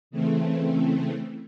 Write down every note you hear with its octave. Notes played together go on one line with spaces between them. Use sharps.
C#3 E3 A3 C4